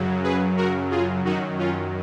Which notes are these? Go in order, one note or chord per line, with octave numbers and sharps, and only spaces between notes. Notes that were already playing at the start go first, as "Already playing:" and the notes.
Already playing: F#2 C#3 F#3
G#4 B4
F#4 A#4
F4 G#4
F#2 D#3 F#3 D#4 F#4
C#4 F4